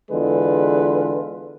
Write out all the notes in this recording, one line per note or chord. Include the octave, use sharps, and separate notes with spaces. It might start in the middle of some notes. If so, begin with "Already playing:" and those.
E2 D3 G#3 F4 B4